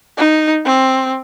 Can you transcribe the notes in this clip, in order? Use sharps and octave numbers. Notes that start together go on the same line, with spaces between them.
D#4
C4